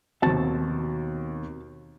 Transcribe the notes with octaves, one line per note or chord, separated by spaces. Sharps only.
D#2 B2 C4 F#4 A5 A6